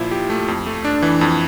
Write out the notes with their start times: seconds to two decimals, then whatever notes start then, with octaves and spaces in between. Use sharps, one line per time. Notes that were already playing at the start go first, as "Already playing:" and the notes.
Already playing: A#2 F3 E4
0.11 G4
0.30 A3
0.48 F2
0.66 A3
0.85 D4
1.02 E3
1.21 F2